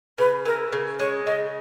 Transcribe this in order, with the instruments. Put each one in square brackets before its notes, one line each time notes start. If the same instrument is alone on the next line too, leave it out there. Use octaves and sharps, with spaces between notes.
[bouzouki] C#3 [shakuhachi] B4
[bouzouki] E3 [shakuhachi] A#4
[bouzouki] C#3
[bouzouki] G#3 [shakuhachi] C#5
[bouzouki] C#3 [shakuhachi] D#5